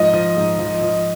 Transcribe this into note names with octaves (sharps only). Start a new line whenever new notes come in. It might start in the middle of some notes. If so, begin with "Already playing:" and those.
Already playing: G#2 F3 D#5
F3
G#2
F3
F3